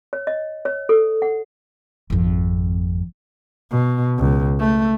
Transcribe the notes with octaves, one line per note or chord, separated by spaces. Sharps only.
C#5
D#5
C#5
A4
F#5
G#1 F2
B2
C#2
A3